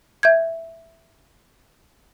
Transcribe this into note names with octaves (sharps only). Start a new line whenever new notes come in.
E5 G6 G#6